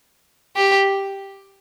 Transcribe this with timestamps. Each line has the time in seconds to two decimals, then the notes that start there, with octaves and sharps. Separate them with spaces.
0.56 G4